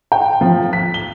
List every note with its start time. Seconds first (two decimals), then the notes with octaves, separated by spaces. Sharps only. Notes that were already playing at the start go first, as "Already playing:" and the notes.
0.12 G5
0.41 F3
0.73 B6
0.94 G7